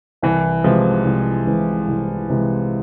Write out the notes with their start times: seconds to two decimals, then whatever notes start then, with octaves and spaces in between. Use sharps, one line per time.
0.22 C2 E3
0.64 C3 E3 F3 G#3
1.05 C2
1.47 C3 E3 G#3
1.88 C2
2.30 C3 E3 G#3